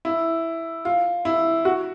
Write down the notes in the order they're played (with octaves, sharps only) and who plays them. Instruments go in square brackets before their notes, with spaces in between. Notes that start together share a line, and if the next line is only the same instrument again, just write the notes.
[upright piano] E4
F4
E4
F#4